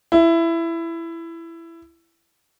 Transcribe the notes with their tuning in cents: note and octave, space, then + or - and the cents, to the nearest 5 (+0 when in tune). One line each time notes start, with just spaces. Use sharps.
E4 +15